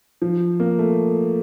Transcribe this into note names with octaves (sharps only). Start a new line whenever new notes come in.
F3
A#3
A3